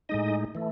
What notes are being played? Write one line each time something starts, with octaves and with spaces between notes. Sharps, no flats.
A2 G#3 D#4 D#5
E3 A3